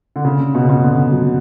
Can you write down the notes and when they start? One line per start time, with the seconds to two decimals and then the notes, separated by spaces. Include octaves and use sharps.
0.16 D3
0.25 C#3
0.54 B2
0.62 C#3
0.69 B2
0.83 D3
1.12 F#3